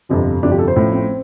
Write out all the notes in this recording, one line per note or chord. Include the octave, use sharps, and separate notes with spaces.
G1 F2 C3 F3
G1 F2 C3 F3 D4
G4
A4
C5
A1 A2 F3 C4
C4